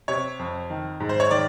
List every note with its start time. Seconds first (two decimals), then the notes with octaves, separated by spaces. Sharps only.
0.08 C3 C#5
0.39 F2
0.70 D#3
1.00 G#2
1.09 C5
1.20 C#5
1.31 D#3 D5